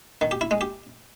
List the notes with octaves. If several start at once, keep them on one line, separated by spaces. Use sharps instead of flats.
D#3
G4
E4
G#3
G4